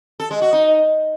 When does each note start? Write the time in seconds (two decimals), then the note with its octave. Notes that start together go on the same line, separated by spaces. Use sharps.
0.20 A4
0.31 G#3
0.42 F#4
0.53 D#4